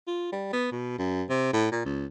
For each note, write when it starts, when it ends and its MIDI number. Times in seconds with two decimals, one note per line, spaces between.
0.07 0.32 65
0.32 0.53 55
0.53 0.68 59
0.72 0.96 47
0.99 1.23 42
1.30 1.52 48
1.53 1.69 45
1.72 1.83 46
1.85 2.06 37